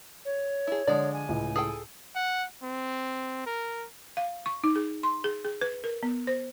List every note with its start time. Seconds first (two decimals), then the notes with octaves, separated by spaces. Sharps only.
0.25 C#5
0.67 E4 G#4
0.87 D3 F3 G#3 D5
1.13 G#5
1.29 C#2 A2
1.56 G#4 A4 G5
2.15 F#5
2.63 C4
3.46 A#4
4.17 F5
4.46 C#6
4.64 D#4
4.76 G#4
5.03 C6
5.24 G#4
5.45 G#4
5.61 B4
5.84 A#4
6.03 B3
6.27 C5